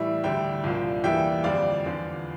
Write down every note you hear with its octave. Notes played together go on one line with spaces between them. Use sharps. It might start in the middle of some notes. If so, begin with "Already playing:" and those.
Already playing: A2 E3 G3 E5
D2 D3 G3 E5 G5
C2 A#2 F3 A#3 D4
E2 E3 G3 A#3 E5 G5
F2 D3 G3 D4 D5 F5
E2 D3 F3